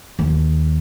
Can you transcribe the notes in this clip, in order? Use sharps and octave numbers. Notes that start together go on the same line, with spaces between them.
D#2